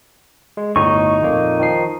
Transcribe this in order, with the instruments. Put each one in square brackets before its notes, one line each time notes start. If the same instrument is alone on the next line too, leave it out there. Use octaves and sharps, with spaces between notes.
[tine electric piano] G#3
[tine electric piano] G1 D2 A2 [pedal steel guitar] D#4 C#6
[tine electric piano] F2 A#2 A#3
D#3 F3 C7